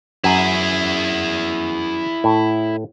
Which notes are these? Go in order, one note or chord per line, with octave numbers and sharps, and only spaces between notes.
F#2 E4 G#4
A2